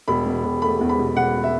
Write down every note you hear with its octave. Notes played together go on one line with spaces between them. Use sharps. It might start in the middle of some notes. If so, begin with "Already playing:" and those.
E1 B5
B2
E1
A3 B5
E2
B5
B2
E1 F#5
E5